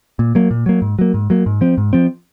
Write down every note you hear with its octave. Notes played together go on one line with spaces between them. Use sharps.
A#2
F#3 A#3
A#2
F#3 A#3
G#2
F#3 A#3
G#2
F#3 A#3
G#2
F3 C4
G#2
F3 C4